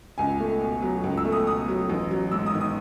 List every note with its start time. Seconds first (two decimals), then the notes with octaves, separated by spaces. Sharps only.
0.18 C#2 G#5
0.40 A3
0.61 B2
0.82 F#3
1.04 C#2
1.17 E6
1.25 A3
1.32 D#6
1.46 B2 D#6
1.68 F#3
1.90 A1
2.11 F#3
2.31 G#2 E6
2.46 D#6
2.54 D#3
2.61 D#6